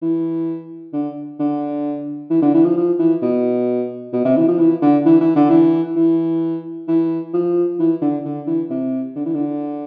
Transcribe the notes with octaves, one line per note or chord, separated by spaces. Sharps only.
E3
D3
D3
E3
D3
E3
F3
F3
E3
B2
B2
C3
E3
F3
E3
D3
E3
E3
D3
E3
E3
E3
F3
E3
D3
D3
E3
C3
D3
E3
D3